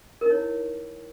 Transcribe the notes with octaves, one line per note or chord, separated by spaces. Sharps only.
D#4 E4 A#4 C#5